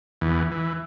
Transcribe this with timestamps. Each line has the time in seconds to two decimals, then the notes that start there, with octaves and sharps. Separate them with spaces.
0.21 E2
0.52 E3